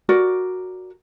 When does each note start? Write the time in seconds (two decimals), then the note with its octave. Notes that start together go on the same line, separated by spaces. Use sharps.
0.09 F#4 A#4 D5